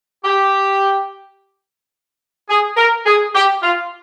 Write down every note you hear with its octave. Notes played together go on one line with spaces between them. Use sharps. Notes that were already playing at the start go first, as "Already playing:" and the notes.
G4
G#4
A#4
G#4
G4
F4